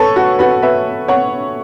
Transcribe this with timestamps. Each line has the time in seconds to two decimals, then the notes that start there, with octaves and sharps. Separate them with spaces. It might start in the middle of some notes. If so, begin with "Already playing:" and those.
Already playing: A4 B4 C#5
0.16 F#4
0.39 F#4 B4
0.62 B4 E5
1.08 C#5 F#5